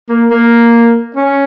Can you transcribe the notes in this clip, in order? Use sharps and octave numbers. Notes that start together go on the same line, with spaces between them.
A#3
A#3
C#4